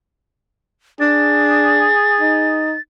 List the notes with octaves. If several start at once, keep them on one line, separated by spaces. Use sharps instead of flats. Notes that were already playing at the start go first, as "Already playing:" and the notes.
D4 G#4 A6
D#4